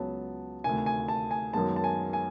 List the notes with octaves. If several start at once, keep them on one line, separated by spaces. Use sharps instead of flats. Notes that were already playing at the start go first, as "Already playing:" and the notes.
Already playing: C#2 C#3 F#3 B3 A5
D2 C3 D#3 G#5
G#5
A5
G#5
F#2 D#3 G#3 B3 A5
A5
G#5
G#5